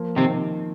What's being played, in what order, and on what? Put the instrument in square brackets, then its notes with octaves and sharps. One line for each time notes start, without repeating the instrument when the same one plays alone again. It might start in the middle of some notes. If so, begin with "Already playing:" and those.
Already playing: [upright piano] F3 A#3
[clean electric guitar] C3 C4 [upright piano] D#3